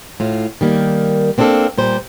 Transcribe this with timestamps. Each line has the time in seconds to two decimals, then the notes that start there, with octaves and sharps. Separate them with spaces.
0.20 A2 F4
0.61 D#3 G3 A#3
1.38 A#3 C4 D4 F4 A4 F5
1.78 A#2 G3 C5